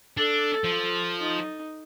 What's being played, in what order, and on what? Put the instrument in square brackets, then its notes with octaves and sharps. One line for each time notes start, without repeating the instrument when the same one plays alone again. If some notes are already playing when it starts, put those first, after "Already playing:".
[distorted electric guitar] D4 [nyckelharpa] A4
[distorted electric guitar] F3
[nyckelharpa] D#4